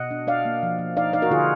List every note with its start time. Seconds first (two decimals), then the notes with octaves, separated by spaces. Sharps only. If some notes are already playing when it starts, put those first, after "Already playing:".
Already playing: B2 D#5 F#5
0.11 D4
0.27 D4 D5 F5
0.45 A#3
0.63 F3
0.79 F3
0.97 D#4 D5 F5
1.13 D#4 D5 F5
1.22 F#4 A#4
1.31 D3 F4 G#4